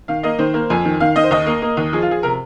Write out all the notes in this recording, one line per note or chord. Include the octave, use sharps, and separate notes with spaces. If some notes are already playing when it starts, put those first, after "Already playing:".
D#3 F5
A#3 D#5
D#3 C5
A#3
F2 G#5
D#3
D#3 F5
D#3 D#5
C5
D#2 D#5
A#3
A#3
D#2
F3 G#4
F4
F3 G#4
C3 A#4